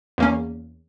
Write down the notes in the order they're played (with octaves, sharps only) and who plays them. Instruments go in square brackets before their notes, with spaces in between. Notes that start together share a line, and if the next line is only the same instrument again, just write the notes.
[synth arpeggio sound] E2 A#3 C#4